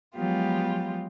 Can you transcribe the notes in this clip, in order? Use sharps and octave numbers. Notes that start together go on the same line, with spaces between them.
F3 F#3 G#3 B3 F4 G4